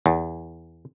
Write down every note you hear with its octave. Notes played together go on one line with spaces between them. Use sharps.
E2